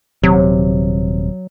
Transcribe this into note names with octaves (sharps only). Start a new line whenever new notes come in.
D#1 C3 F#3